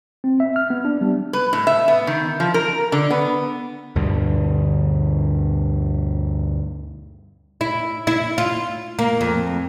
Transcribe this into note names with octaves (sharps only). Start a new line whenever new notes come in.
C4
E5
F6
B3
D4
G3
B4
A2
E5
B3
D#3
F3
A#4
D3
B3
D2 G2 B2 D3
E4
E4
F4
A#3
F2